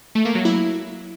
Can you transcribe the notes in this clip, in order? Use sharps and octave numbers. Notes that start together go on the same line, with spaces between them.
A3
A#3
F#3
E4